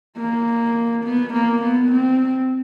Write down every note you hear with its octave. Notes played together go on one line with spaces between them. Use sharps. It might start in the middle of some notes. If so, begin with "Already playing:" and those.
A#3
B3
A#3
B3
C4